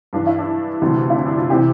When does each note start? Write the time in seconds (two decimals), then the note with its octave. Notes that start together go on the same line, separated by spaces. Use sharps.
0.13 G2 E3 D4
0.27 E4
0.39 D4
0.81 D2 C3 E3
1.10 E4
1.16 D4
1.27 D4
1.38 F4
1.50 C3 E3 G4